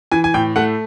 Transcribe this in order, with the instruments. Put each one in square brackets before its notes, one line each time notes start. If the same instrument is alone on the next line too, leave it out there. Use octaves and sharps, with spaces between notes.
[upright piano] E3 G#5
G#5
A2 G5
A3 F#5